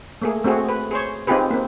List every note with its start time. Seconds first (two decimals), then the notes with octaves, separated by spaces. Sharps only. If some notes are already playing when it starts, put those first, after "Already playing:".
0.22 A3 A#3 G#4
0.44 A3 C4 F#4 G#4
0.69 B4
0.91 G#4 C5 C#5
1.27 C4 D#4 F4 G4 G#4 B4
1.51 A#3 C4